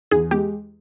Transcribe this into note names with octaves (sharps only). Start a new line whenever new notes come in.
E2 G#4
G#3 G4